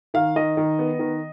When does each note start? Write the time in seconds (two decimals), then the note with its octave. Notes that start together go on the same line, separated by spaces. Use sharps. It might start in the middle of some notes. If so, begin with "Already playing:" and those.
0.14 D#3 F5
0.36 D#3 D#5
0.57 D#3
0.79 B3
0.99 D#3